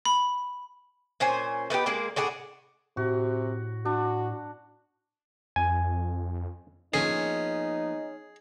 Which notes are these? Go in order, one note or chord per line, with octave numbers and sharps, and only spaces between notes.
B5
A#2 C#4 C5 G#5
A3 B3 D#4 G4
G#3 A#3 G#4 D5
A2 D4 G#4 F#5
A2 C3 F#4
D4 F#4
F2 G#5
F3 A#3 B3 C#4 D#4 G#4